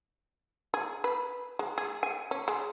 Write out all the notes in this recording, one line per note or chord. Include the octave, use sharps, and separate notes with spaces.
G#4
B4
G#3
G#4
G#5
C#4
G#3